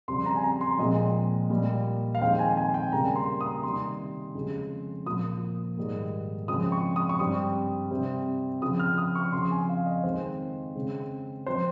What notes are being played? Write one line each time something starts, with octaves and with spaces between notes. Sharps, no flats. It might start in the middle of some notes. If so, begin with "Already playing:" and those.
F2 C#3 G3 C4 C6
A#5
G#5
A#5
C6
A#2 F3 G#3 C4 D#5
A#2 G3 A#3
F5
F2 D#3 G#3 C4 G5
G#5
G#5
G5
C#3 G3 A#3 A#5
C6
D#6
C3 D#3 G3 C6
F2 C#3 F3 G#3
A#2 F3 A#3 D#6
G#2 D#3 G3 A#3
C#3 F3 G#3 C4 D#6
C#6
D#6
C#6
G2 G3 C4 D#6
C3 G3 C4
C#3 F3 C4 D#6
F6
D#6
C#6
F2 C#3 F3 C4 C6
G#5
F5
D#5
F2 D#3 G#3 C4 C5
C#3 G#3 C4
F3 C4 C5